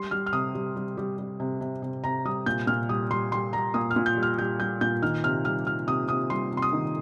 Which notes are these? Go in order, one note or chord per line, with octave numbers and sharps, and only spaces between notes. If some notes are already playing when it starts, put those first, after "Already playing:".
Already playing: G3 C6
G3 F6
F6
C3 D#6
G3
G3
G3
G3
C3
C3
C3
C3 A#5
G3 D#6
A#2 G6
A#2 F6
G3 D#6
G3 C6
G3 C6
G3 A#5
A#2 D#6
F6
A#2
G6
G3
F6
G3 G6
G3 G6
A#2 G6
D#3 F6
C3 F6
G3 F6
G3 F6
C3 D#6
C3 D#6
G3 C6
C3
C6
D#6
D#3